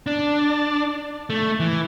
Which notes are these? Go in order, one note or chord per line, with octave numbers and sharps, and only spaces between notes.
D4
A3
E3